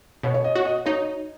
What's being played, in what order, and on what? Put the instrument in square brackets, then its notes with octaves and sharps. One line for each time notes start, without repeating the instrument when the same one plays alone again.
[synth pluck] B2 [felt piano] C#5
[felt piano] C#5
D#5
[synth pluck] F#4 [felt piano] C#5
[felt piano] D#5
[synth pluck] D#4 [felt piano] C#5